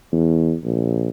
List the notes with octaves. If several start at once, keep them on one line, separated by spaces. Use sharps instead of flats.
E2
A#1